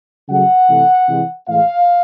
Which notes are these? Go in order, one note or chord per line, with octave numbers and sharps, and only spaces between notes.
C#3 F#3 A3 F#5
C3 E3 A3
C3 E3 G#3
A2 E3 G#3 F5